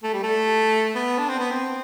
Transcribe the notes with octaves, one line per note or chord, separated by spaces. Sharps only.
A3
G3
A3
B3
D4
C4
B3
C4